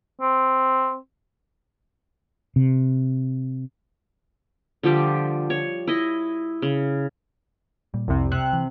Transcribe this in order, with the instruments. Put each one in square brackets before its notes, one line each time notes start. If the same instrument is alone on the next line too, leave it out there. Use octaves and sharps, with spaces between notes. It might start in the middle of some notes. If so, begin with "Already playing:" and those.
[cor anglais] C4
[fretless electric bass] C3
[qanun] D3 F3 G3 G4
C#5
E4 D#5
C#3
[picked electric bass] A#2 G3
[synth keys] C2 C3 [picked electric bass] F2
[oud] C3 [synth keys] F#6
[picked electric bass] E3